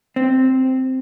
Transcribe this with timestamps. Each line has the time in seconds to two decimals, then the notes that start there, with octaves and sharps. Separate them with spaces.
0.16 C4